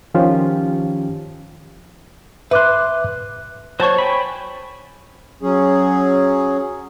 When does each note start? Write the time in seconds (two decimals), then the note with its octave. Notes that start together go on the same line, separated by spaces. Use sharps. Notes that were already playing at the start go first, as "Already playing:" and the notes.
0.14 D#3 F3 C#4 F4 G4
2.51 B4 E5 C6 D6 F#6
3.80 F#3 C5 C#5 A5 C#6
3.98 G5 G#5 B5
5.42 F#3 C#4 G#4